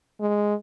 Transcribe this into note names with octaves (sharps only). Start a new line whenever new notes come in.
G#3